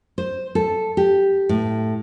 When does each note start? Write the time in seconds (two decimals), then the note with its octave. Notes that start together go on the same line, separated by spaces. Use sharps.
0.18 C5
0.55 A4
0.97 G4
1.49 A2